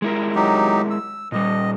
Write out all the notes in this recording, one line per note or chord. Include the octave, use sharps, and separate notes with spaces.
G#3 E4 A#4
F#3 D#4 G4
E6
A#2 G3 D#5